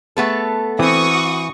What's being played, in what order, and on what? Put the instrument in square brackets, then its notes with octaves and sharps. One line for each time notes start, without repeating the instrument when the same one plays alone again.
[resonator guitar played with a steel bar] A3 B3 A4 [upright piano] G#4
[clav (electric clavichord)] E3 [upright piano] C4 [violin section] F#4 C#6 D#6